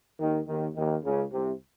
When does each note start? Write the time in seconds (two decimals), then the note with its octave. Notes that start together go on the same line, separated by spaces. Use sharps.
0.19 D#2 D#3
0.48 D#2 D#3
0.76 D#2 D#3
1.03 C#2 C#3
1.32 C2 C3